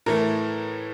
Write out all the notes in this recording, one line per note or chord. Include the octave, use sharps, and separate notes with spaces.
A2 E3 A3 A#4